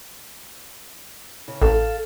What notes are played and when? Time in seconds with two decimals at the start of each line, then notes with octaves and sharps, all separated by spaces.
1.48 C#3
1.62 A1 A4 F5